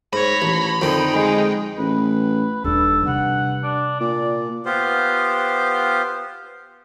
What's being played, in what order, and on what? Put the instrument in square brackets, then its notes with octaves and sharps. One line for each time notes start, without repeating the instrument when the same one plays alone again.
[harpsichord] G#2 [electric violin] C#5 A#6 [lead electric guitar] B5
[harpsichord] A1
[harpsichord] F2 D3 [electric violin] D#4 G5
[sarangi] G#3
[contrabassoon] A1 [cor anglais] B4
[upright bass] D#1 F4 [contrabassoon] G2 [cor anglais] A4
[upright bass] C3 [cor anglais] F#5
[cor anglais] D4
[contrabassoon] A#2 [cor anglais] D5
[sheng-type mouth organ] B3 F4 G4 C5